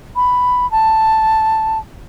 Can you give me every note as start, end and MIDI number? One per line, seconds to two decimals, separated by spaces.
0.16 0.69 83
0.71 1.79 81